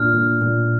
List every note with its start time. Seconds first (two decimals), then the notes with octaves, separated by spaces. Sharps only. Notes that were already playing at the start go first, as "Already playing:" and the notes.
Already playing: A#2 D4 F6
0.13 A#2
0.41 A#2